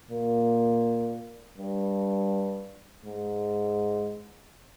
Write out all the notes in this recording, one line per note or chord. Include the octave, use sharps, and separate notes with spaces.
A#2
G2
G#2